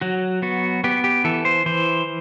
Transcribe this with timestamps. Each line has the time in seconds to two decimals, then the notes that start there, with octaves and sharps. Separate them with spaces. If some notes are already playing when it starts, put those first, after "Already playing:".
0.01 F#3 F#4
0.42 B3 F#4
0.84 B3 G4
1.04 G4
1.24 E3 A4
1.45 C5
1.66 E3 C5